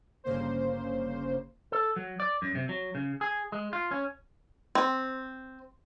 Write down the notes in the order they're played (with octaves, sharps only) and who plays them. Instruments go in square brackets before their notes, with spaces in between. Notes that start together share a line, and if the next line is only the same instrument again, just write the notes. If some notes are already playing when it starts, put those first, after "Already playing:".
[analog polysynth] G1 C#3 A#3 C5
[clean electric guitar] A4
F#3
D5
F#2
C3
F#3
C#3
G#4
G#3
F4
C#4
[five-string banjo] C4